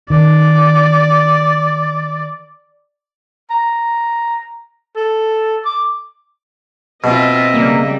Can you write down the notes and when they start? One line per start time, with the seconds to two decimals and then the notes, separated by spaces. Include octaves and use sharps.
0.10 D#3 D5
3.50 A#5
4.96 A4
5.66 D6
7.04 B2 C4 F4 D#5 E5
7.54 C#3 G3 A#3